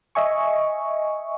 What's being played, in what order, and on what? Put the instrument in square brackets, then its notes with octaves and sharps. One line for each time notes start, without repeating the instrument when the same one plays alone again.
[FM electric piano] D#5 E5 G#5 C#6